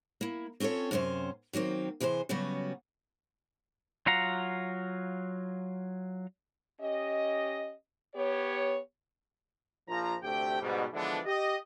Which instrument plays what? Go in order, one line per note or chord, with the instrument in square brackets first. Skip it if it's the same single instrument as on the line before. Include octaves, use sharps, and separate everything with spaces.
[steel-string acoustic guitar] A#3 E4
C4 C#4 F4 A4 C#5
F#2 C3 C#4 F#4 C5
D#3 F#3 A#3 C4
C3 E3 G#4 A#4 C5
C#3 F#3 G3 B3 C#4 F#4
[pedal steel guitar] F#3 F4 F5 F#5 A#5
[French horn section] C#4 G4 D#5
B3 G4 C#5
[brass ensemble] A#1 F3 A#5
D2 C3 A3 G4 G5
G#2 B2 G3
D3 E3 F3 G#3 B3 D4
G4 D#5